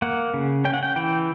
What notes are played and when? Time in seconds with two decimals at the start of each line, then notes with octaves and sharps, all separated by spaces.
0.02 A#3 F#5
0.34 C#3
0.65 C#4 G5
0.74 F#5
0.83 G5
0.96 E3 G5